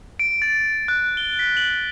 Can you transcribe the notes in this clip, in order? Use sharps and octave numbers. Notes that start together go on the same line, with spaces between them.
D7
A6
F#6
G7
B6
F#7